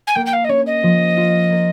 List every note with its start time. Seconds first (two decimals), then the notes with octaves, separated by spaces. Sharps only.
0.07 G#5
0.15 A#3 G5
0.26 G5
0.33 F5
0.44 D#5
0.49 C#4 C#5
0.67 D#5
0.83 F3
1.17 F4
1.50 A#3